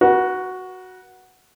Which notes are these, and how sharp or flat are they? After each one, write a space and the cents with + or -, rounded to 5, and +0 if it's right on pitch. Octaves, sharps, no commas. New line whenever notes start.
F#4 +0 B4 -45